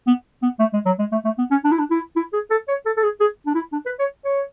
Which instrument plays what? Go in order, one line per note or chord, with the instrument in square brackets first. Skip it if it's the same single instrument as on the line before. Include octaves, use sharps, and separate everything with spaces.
[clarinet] B3
B3
A3
G#3
F#3
G#3
A3
A3
B3
C#4
D4
E4
D4
E4
E4
G#4
A4
C#5
A4
A4
G#4
G#4
D4
E4
D4
B4
C#5
C#5